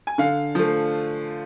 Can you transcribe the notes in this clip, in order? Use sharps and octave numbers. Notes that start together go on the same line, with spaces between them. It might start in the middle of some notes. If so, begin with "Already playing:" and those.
G#5
D3 F5
F3 A3